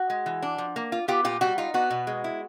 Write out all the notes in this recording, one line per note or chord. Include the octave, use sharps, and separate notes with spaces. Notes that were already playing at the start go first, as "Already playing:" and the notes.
Already playing: F#4
G#3
E3
D4
F3
A#3
F4
B3 F4 G4
A#2 F4 G4
G3 F#4
D#4 F4
B3 F#4
B2
G#3
E4